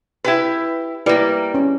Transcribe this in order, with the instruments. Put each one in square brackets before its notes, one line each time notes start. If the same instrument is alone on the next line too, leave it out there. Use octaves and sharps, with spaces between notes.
[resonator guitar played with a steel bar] E4 G4 B4
[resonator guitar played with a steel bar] G3 A#3 [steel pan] E4 B4 D5
[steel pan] C#4